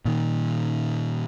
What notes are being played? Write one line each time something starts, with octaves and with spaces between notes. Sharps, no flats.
A#2 D#3